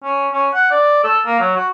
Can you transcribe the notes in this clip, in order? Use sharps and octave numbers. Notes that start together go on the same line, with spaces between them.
C#4
C#4
F#5
D5
A4
A#3
F#3
F#4